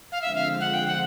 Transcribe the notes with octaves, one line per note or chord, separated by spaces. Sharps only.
F5
D3 F3 G#3 C4 E5
F5
F#5
G5
F#5